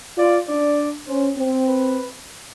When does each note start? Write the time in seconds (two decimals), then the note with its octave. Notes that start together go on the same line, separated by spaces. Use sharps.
0.18 F4 D5
0.48 D4 D5
1.07 C#4 C5
1.37 C4
1.67 B4